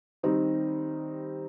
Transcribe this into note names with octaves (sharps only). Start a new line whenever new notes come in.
D#3 G3 C4 D#4